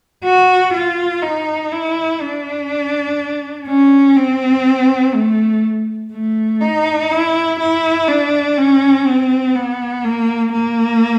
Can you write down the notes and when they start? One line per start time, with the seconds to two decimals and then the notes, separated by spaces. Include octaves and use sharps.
0.24 F#4
0.73 F4
1.22 D#4
1.72 E4
2.21 D4
3.68 C#4
4.16 C4
5.14 A3
6.13 A3
6.61 D#4
7.11 E4
7.60 E4
8.08 D4
8.57 C#4
9.06 C4
9.55 B3
10.05 A#3
10.53 A#3